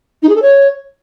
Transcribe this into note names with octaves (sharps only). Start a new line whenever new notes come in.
D#4
G#4
A4
C#5